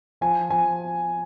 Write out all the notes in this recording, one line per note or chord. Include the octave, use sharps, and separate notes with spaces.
F3 G#5
F3 G#5